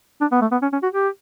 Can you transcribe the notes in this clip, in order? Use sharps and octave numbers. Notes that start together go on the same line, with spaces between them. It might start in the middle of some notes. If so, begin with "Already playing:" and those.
D4
B3
A3
B3
C#4
C#4
F#4
G4